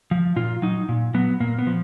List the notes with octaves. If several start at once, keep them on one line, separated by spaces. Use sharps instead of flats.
F3
A#2 F4
F#3 D#4
A#2
F#3 B3
A#2 A#3
B3
F3